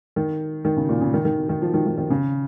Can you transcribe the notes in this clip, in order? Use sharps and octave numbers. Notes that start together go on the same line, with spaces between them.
D#3
D#3
C#3
A#2
C#3
D#3
D#3
D#3
F3
D#3
D#3
D#3
C#3